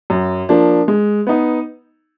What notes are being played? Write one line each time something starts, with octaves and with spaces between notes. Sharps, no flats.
F#2
F3 A#3 D4
G#3
B3 D#4